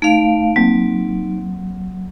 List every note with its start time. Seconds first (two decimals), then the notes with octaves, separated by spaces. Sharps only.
0.02 A3 D#4 F5 D7
0.56 F#3 A#3 C4